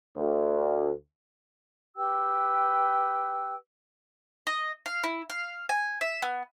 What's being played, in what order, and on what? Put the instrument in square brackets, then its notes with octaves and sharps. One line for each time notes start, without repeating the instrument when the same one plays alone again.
[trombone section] D2
[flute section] G4 B4 G5 E6
[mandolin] D#5
F5
E4
F5
G#5
E5
B3